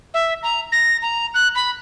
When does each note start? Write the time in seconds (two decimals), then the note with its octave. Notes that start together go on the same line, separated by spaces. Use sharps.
0.14 E5
0.43 A#5
0.72 A#6
1.02 A#5
1.35 F#6
1.55 B5